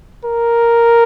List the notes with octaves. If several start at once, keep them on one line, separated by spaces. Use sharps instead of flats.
A#4